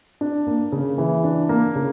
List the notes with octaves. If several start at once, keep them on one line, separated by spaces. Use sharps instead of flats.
D4
A#3
C#3
E3
D4
A#3
C#3